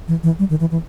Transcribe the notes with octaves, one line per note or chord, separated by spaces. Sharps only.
E3
E3
G3
D#3
E3
E3